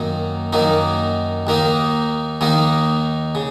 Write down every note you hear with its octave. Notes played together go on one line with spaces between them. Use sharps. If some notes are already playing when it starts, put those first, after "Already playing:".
Already playing: F#2 D#3 A#3 D#4
F#2 D#3 A#3 D#4
D#2 D#3 A#3 D#4
D#2 D#3 A#3 D#4
C#3